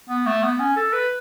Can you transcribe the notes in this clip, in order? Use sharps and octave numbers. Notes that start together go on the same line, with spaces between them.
B3
A3
B3
C#4
A4
B4